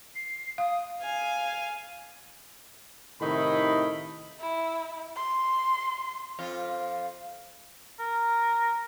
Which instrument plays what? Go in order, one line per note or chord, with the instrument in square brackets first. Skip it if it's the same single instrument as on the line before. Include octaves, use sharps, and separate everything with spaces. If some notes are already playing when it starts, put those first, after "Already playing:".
[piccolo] C7
[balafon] F5 [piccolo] D#6
[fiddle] F5 G#5
[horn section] A2 C3 D#3 D#4 E4 B5
[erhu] E4
C6
[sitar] F2 F4
[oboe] A#4